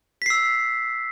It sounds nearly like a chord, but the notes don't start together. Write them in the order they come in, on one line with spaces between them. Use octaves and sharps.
B6 C7 E6